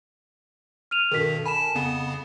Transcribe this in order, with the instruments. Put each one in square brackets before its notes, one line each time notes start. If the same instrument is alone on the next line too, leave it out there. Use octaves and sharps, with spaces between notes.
[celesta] F6 D#7 F7
[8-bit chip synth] G2 B2 D#3 [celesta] A4 A#4 B6
[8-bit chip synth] G#5 A5 [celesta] B5 E7
[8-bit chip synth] F2 C#3 B3